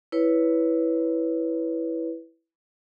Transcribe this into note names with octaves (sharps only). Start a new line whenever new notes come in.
E4 B4 C#5